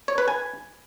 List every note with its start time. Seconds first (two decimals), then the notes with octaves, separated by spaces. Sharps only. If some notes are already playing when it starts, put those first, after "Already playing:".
0.08 C#5
0.18 B4
0.28 G#5